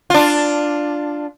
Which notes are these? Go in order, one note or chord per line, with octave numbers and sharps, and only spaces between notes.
D4 F4